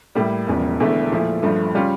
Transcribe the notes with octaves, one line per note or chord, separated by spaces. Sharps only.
A2 G3 A#3
E1 E2 C#3 F3
E1 E2 D3 A3 E4
A#2 F3 A3 E4
G1 G2 F3 A3
C#3 G3 C#4 F4